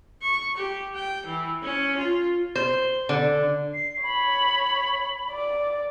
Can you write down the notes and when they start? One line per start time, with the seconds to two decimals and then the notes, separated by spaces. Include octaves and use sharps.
0.22 C#6
0.57 G4
0.95 G5
1.26 E3
1.63 C#4
1.97 F4
2.55 C5
3.09 D3
3.74 C7
4.03 C#5 B5
5.30 D5